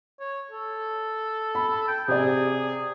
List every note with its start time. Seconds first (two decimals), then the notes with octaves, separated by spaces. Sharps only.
0.20 C#5
0.51 A4
1.55 B5
1.88 G5
2.08 C3 G#4 D5